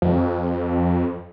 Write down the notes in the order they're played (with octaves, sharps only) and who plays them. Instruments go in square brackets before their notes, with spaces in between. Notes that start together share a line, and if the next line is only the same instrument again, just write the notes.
[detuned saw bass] F2